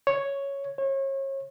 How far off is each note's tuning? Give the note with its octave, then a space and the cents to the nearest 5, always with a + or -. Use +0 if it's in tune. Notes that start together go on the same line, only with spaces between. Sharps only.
C#5 +0
C#5 -35